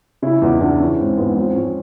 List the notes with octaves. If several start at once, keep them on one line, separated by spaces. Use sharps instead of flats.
C#3 E4
E2 D#4
E2 D4
E3 C#4
G#2 C4
G#2 B3
F3 C4
G#2 C#4